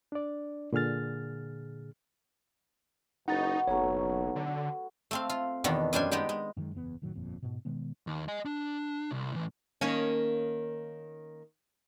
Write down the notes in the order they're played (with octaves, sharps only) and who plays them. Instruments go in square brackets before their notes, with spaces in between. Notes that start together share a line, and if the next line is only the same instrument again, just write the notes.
[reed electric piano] D4 D5
A#2 D3 G#4 F6 A6
[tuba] F#1 [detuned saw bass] D#4 [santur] F#4 B4 C#6 [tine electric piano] F#5 A6
[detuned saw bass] F#1 [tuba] B1 [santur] F#3 A3 C#4 [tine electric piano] C#5 F#5 A#5
[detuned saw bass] D3
[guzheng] A3 C4 F5
F4
E2 B2 D#3 B3 D4
F#2 G3 D4 C5 G#5
G#3 B3 D#4 G4
G#3
[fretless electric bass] F#2 D#3 F3 G#3
F#1 E2 B3
F1 A2 D#3 F#3
G1 F2 A#2
G#2 B2
B2 D#3 G#3 B3
[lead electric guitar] D#2
D#5 G#5
D4
C2
A2 E3
[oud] D#3 A#3 C#4